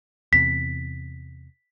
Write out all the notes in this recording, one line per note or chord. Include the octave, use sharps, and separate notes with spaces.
E2 C3 B6